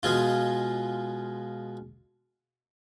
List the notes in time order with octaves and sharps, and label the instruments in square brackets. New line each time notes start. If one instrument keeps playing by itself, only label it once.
[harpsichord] B2 G#3 F4